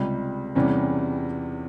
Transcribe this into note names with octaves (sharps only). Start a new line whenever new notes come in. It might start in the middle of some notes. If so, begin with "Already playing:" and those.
Already playing: C#2 C3 G3
E2 C3 G3 C#4 E4